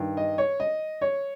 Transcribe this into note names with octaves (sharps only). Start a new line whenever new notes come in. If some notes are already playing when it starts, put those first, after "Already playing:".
Already playing: G2 D#3
D#5
C#5
D#5
C#5